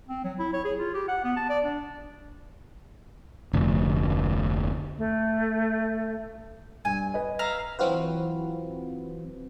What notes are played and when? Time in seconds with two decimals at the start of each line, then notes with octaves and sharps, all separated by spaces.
0.09 C4
0.24 F#3
0.39 E4
0.53 C#5
0.65 G#4
0.79 F4
0.94 G4
1.08 F#5
1.24 B3
1.37 A5
1.49 D5
1.64 D4
3.53 F1 D2
4.98 A3
6.85 G2 G#5
7.14 B4 D#5
7.39 E5 F5 A#5
7.79 E3 F#3 C4 F4 F#4 B4